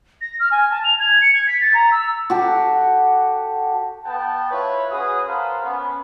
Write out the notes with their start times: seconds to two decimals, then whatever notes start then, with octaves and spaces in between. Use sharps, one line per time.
0.21 A#6
0.40 F6
0.51 G#5
0.71 A5
0.84 F7
0.99 G#6
1.21 C#7
1.33 G#6
1.47 B6
1.61 A6
1.74 A#5
1.91 E6
2.30 F#4 G4 A4
4.05 B3 F#5 G5 A5
4.51 E4 F4 B4 C#5
4.91 C#4 F#4 G#4 B4 D#6
5.27 A#4 C5 F5 F#5 A5 B5
5.64 B3 C#4